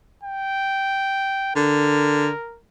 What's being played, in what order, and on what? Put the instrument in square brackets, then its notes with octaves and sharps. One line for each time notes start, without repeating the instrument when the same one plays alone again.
[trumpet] G5
[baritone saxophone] D3 [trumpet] A#4